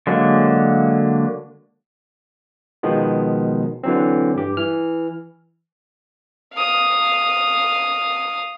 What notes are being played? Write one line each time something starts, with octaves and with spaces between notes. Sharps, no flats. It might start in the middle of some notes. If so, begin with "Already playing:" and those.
D3 F#3 G#3 A#3
B2 D#3 F3 G#3 B3
D3 E3 F#3 C4
G2 G4
E3 F6
F5 D#6